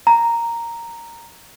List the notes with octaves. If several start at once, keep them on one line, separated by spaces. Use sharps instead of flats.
A#5